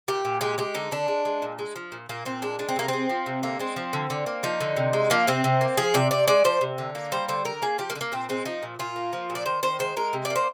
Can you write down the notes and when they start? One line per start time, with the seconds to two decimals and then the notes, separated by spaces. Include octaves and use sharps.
0.08 A#2 G4
0.25 A#2
0.41 G#3 G4
0.58 G#3 G4
0.74 D3 D#4
0.91 D3 D4
1.08 G#3
1.25 G#3
1.42 A#2
1.59 G#3
1.76 F3
1.92 A#2
2.09 A#2 A#3
2.25 A#2 C4
2.42 G#3 D4
2.59 G#3 D4
2.69 C4
2.76 C3 A#3
2.88 G#3 C4
3.09 F3
3.26 C3
3.43 D3 A#3
3.59 G#3 C4
3.76 F3
3.93 D3
4.10 D3
4.26 A#3
4.43 F3 D#4
4.61 D3
4.77 C3
4.93 G#3
5.10 F3 A#3
5.27 C3 C4
5.44 C3
5.61 A#3
5.77 F3 G#4
5.94 C3 D5
6.11 C3 D5
6.28 G#3 D5
6.44 F3 C5
6.61 C3
6.78 D3
6.95 A#3
7.12 G3 C5
7.28 D3 C5
7.45 D3 A#4
7.62 A#3 G#4
7.78 F3 G4
7.90 A#3
7.95 D3
8.01 A#3
8.12 A#2 C4
8.29 G#3 C4
8.45 F3 D#4
8.63 A#2
8.79 A#2 F4
8.96 A#3
9.13 F3
9.30 A#2
9.35 D5
9.46 D#3 C5
9.63 D#3 C5
9.79 G#3 C5
9.97 G#3 A#4
10.13 C3
10.25 D5
10.30 A#3
10.36 C5